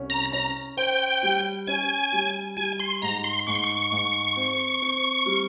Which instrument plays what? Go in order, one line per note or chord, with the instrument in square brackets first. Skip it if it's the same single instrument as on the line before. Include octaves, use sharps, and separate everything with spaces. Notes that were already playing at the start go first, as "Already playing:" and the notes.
Already playing: [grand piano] C2 C#4
[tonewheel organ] A#5
[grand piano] C#4 [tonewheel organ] A#5
[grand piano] C5 [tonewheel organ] G5
[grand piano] G3
[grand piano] C#4 [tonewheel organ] G#5
[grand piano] G3
[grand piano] G3 [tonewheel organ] G#5
[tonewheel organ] C6
[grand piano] G#2 [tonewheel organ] A#5
[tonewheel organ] C6
[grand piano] G#2 [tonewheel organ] C#6
[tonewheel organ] C6
C#6
[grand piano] G#2
C4
C4
G3